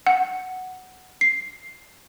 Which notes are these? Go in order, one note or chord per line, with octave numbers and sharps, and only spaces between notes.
F#5
C7